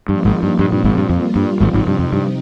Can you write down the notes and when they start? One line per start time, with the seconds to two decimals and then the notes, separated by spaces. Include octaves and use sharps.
0.08 G2 F3 A#3 D#4
0.25 G#1 G#2
0.43 G2
0.59 G2 A#2 F3 C4
0.72 G2
0.84 G#1 G#2
0.97 G2
1.10 F2 G3 A#3 F4
1.36 G2
1.60 G#1 G#2 C3 F3 C4 D#4
1.73 G#1 G#2
1.87 G2
1.99 F2
2.13 G2